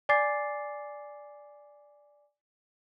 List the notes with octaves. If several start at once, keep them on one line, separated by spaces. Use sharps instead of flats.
D5 G#5 D6 A6 C7